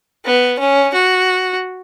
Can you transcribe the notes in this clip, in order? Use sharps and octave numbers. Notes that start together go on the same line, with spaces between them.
B3
C#4
F#4